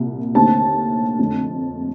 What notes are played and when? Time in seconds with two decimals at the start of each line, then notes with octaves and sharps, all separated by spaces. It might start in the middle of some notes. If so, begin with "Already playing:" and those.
Already playing: C2 A#2
0.35 D#2 D3 A3 C4 A5
1.19 F2 D3 A3